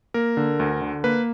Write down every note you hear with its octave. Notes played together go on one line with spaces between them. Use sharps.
A#3 A#4
D3
D2
D3
A#3 B4